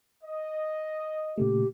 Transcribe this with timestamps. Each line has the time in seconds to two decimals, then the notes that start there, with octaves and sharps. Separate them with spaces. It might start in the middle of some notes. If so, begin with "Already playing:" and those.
0.24 D#5
1.38 A#2 C#3 A3 G4